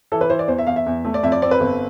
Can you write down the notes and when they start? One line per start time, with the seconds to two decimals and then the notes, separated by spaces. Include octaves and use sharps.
0.12 E3 A4
0.21 B4
0.30 E3 C5
0.39 D5
0.48 E2 C5
0.58 E5
0.67 E2 F5
0.76 E5
0.86 E2
1.05 A3
1.14 D5
1.23 F2 E5
1.32 D5
1.42 C4 D5
1.51 B4
1.60 G1